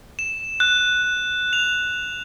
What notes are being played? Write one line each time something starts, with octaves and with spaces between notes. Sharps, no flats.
E7
F#6
F7